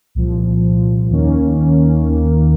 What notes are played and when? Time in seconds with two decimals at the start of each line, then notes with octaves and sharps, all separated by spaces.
0.15 C2 A#2 F3
1.11 D#2 D#3 A#3 C#4
2.07 D#2 D#3 A#3